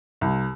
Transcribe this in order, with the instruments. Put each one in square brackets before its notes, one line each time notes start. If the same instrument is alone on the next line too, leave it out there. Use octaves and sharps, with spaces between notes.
[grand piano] C2